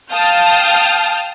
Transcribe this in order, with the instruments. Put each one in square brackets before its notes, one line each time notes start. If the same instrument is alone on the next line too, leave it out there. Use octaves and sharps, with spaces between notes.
[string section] F5 G5 A5 D#6 F6 G6